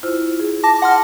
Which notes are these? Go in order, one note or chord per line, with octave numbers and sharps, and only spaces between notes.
E4 F4 C5
G#4
A5 D6 A#6
F#5 A5 C6 F6